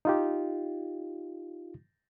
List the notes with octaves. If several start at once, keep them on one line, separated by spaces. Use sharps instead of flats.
D#4 F4 G4